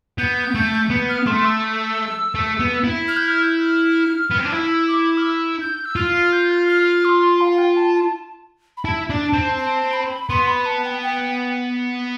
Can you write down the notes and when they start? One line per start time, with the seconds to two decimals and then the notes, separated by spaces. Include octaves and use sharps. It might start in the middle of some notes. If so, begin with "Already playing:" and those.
0.18 B3 G6
0.55 A3
0.90 B3
1.09 F6
1.27 A3 C6
1.45 E6
2.35 A3
2.60 B3
2.84 E4
3.08 F6
3.17 G6
3.25 F6
3.43 G6
3.61 F6
4.31 B3
4.38 C4
4.45 D4
4.51 E4 E6
4.88 D6
5.17 F6
5.24 E6
5.60 G6
5.85 E6
5.96 F4 F6
6.15 F6
6.33 G6
6.51 F6
6.68 F6
7.05 C6
7.41 F5
7.58 G5
7.77 A5
7.95 A5
8.77 B5
8.85 E4 A5
9.10 D4
9.33 C4
9.58 A5
9.93 B5
10.30 B3 C6
10.47 B5
10.66 A5
10.85 G5
11.02 G5